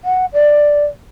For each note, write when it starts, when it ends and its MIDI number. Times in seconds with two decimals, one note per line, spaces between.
0.04 0.25 78
0.33 0.84 74